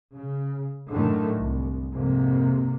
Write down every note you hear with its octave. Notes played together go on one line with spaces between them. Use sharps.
C#3
F#2 A2 D3 D#3 A3
C2
F2 G#2 C3 A#3